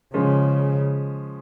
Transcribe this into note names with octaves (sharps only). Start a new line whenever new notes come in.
C#3 F3 G#3 C#4